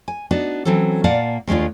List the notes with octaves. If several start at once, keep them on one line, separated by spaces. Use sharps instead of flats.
G#5
B3 D4 D#4 F#4
E3 F#3 C4 C#4 A4
A#2 A#3 D5 F5 F#5 A5
D#2 G#3 A3 D4 F4